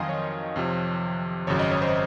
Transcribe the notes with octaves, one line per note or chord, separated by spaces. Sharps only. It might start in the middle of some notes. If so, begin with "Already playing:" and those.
Already playing: F2 D#3 F#3 D#5 F5 G#5 C6
C#5
F2 C3 F3
G#1 F#2 C#3 F#3 C#5
D#5
C#5
C5